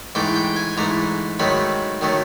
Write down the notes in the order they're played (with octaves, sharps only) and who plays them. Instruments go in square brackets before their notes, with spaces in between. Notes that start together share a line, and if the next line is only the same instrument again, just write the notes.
[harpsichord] G#2 E3 A3 G5
G5
G#5
G#2 E3 A3 A#5
G#2 D#3 F#3 A3 B5
D#3 F#3 A3